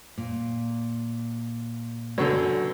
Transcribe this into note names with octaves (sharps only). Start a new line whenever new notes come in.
A#2
F#2 D3 B4